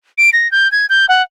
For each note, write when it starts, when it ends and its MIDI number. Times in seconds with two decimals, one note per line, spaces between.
0.18 0.30 98
0.33 0.50 94
0.52 0.70 91
0.72 0.86 92
0.90 1.06 91
1.09 1.22 78